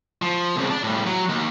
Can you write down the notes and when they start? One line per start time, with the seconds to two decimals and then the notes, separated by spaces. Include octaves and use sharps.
0.22 F3
0.56 C2 C#3
0.70 D5 A5
0.84 A2 G3
1.06 F#3
1.29 D#2